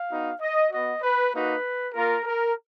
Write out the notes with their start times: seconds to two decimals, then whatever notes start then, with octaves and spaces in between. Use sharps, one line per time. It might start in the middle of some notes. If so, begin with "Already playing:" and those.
Already playing: F5
0.10 B3 D#4 F#4
0.41 D#5
0.71 B3 F#4 D#5
1.02 B4
1.33 A#3 D#4 F#4 B4
1.94 A#3 F4 A#4
2.25 A#4